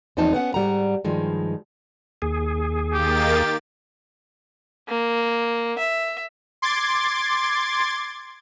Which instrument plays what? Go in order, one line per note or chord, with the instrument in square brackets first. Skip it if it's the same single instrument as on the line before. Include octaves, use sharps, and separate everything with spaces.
[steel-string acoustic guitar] E2 F3 C4 C#4 D#4 A5
B3 C#4 F#5
G#2 G3 F#5 A#5
G2 D#3 F3 G#3
[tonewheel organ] D#2 G#4
[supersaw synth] D#3 A#3 A6 [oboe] G4
[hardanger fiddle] A#3
E5
[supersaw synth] C6 D6 G#6 A6